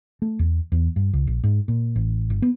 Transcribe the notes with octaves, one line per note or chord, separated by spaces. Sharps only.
A3
E2
E2
G2
C#2
A#1
G#2
A#2
A1
G1
B3